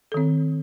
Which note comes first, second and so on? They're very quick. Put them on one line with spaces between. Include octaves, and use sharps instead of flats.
A4 D#3 C4